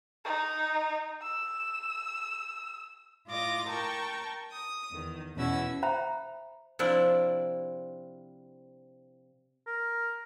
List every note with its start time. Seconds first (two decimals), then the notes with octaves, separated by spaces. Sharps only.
0.25 D#4
1.22 E6
3.28 A2 F4 D#5 D6 A#6
3.68 A#4 G5 A5 C#6
4.52 D#6
4.90 E2 D#3
5.36 E2 B2 C#4 E4 F#4 E6
5.83 C5 E5 G5 A#5 B5
6.79 C3 F3 D4 E4
9.67 A#4